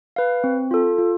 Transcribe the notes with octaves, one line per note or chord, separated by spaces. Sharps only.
B4 F5
C4
F4 A4
F4